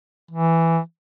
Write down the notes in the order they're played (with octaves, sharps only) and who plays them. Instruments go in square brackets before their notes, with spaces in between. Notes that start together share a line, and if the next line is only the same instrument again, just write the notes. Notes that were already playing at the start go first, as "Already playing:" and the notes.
[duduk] E3